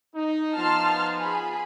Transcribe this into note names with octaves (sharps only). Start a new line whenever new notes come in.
D#4
F3 B3 D#4 A5 C6 F6
G#4 B5